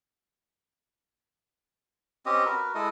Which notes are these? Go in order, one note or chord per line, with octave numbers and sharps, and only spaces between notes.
C4 C#4 G4 D#5
F#4 A#4 B4
G#3 E4 A4 D#5